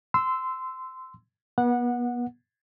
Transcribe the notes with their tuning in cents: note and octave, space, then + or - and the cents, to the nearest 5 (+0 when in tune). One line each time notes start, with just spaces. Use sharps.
C6 -20 E6 +0
B3 -35 F#5 -15